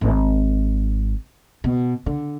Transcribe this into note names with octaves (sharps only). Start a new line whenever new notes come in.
G#1
B2
D3